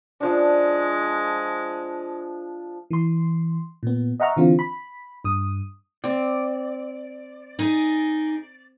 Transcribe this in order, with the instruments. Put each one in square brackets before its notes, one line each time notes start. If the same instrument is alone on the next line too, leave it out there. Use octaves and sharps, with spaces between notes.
[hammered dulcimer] F3 D4 [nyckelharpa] G#3
[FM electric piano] E3 C6
A#2 B3
D#5 E5 F#5 A#5 C#6 F6
D3 E3 C4 F4
B5
G2 D#6
[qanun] C4 [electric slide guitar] D5
[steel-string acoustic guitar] D#4 G#4